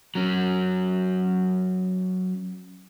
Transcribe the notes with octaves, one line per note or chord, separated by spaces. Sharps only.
F#3 C#4